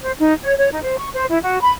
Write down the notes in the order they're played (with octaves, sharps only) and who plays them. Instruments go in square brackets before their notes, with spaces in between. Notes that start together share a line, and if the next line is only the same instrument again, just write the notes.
[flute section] C5
D#4
C#5
C#5
D#4
C5
C#6
C5
E4
F#4
B5